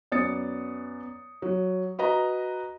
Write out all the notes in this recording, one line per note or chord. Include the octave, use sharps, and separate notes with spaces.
F#2 B3 D5 D#6 A6 C#7
F#3
F#4 B4 D#5 A#5